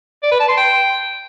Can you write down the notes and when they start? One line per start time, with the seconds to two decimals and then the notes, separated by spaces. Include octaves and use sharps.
0.23 D5
0.32 B4
0.40 A5
0.49 C6
0.57 G5